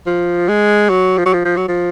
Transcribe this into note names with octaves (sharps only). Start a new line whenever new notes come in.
F3
G#3
F#3
F3
F#3
F3
F3
F#3
F3